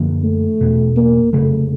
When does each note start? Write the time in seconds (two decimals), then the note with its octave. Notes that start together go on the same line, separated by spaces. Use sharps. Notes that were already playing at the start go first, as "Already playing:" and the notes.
Already playing: F#2 D3 F3 A#3
0.23 A3
0.61 E1 E2 B2
0.96 A#3
1.33 F1 D#2 C#3 F#3 A3